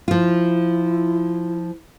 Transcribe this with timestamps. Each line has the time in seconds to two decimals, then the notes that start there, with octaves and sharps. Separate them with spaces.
0.08 F3 E4 F4